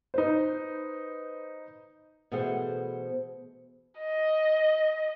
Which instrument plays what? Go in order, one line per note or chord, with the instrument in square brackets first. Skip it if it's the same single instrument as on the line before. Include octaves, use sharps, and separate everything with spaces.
[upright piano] D#4 B4 C5
[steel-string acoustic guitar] B2 E3 A3 G#4 C5 F#5
[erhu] D#5